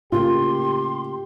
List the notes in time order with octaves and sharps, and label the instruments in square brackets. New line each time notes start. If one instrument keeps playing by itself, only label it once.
[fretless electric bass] A2 C#3 A#3 [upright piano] F4 [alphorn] G4 [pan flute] C6